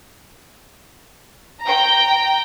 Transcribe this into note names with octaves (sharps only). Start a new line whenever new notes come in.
G5 A#5